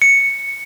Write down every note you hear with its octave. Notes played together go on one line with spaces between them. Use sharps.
C#7